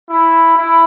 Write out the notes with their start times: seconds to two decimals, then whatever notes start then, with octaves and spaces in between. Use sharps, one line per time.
0.09 E4
0.56 E4